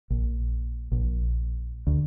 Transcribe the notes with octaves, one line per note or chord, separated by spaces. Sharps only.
A#1
A#1
D2